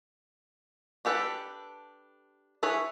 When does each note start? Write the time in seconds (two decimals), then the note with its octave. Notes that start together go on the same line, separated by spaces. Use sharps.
1.05 D4 G4 A4 B4
2.63 E4 G#4 B4 C#5